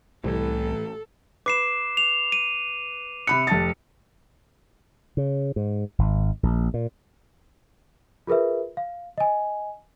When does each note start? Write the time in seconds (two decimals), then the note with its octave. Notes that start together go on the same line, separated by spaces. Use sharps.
0.24 C2 A2 E3 A4
1.46 B4 D6 C7 E7
1.97 F7
2.32 D#7
3.27 C3 B5 F#6 C#7
3.47 F1 A5 A6
5.17 C#3
5.56 G#2
5.99 G#1
6.43 A#1
6.74 A#2
8.27 F4 G#4 A#4 B4 E5
8.77 F5
9.18 D#5 G#5